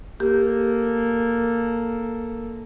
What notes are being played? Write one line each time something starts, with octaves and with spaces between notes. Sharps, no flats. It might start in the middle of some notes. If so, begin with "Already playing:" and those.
A#3 G4 A4